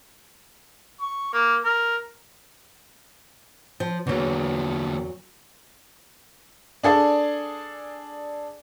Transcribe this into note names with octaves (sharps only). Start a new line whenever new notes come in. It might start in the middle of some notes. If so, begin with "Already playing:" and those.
C#6
A#3
A#4
F3
E2 D3 F#3 A#3
D4 G#4 A4 D5